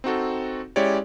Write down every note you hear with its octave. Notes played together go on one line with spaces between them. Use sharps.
C4 D#4 F#4 A4
G#3 C#4 E4 G4 C#5 D5